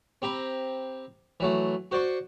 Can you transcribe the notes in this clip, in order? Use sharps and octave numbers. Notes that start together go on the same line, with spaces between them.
C4 G4 A#5 B5
E3 F#3 A3
F#4 C5 D5 C6 C#6